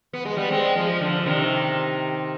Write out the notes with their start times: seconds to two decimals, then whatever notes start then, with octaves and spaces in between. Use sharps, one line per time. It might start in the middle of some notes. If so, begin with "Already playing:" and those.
0.13 B3
0.25 G#3
0.37 G3 B3
0.51 G#3 C4
0.76 F3 G#3
1.01 D3 F3
1.22 D3
1.26 C3 D#3